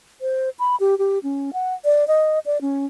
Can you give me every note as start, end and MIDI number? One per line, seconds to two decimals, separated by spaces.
0.21 0.49 72
0.59 0.76 83
0.80 0.98 67
0.98 1.19 67
1.23 1.50 61
1.53 1.74 78
1.85 2.07 74
2.08 2.39 75
2.46 2.61 74
2.61 2.86 61